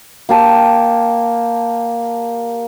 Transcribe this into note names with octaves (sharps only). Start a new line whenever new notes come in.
A#3 G4 A5